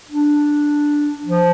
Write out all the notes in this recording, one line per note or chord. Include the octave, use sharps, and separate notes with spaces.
D4
F3